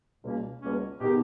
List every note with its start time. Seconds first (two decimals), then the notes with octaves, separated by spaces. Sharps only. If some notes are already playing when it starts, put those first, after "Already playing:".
0.22 C#2 B2 G3 A#3 C#4
0.62 C#2 B2 G3 A#3 C#4
1.00 B2 D#3 G#3 D#4 G4